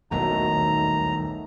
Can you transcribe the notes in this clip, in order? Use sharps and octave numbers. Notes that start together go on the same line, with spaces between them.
D#1 B1 E2 D#3 F#3 A3 A#5